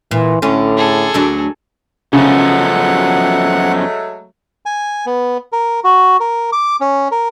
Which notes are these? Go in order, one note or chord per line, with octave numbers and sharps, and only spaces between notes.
A#2 E3
A2 D3 C#4
G#4 A4
D2 F#3 D4
F#2 C#3 F3 F#3 G#3 A3 B3 F#5
G#5
B3
A#4
F#4
A#4
D6
C#4
A#4